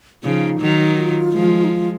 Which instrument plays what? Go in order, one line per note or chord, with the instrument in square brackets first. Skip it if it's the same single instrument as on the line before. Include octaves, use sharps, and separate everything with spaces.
[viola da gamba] C#3 F3 [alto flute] D#4
[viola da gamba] D#3 F#3
[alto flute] F4
[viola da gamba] F3 G#3
[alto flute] D#4
F4